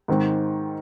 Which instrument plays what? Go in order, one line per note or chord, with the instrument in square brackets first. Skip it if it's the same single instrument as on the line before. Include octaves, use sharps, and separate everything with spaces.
[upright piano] G#2 D#3 C4